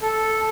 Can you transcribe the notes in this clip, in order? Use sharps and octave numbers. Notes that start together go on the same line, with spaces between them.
A4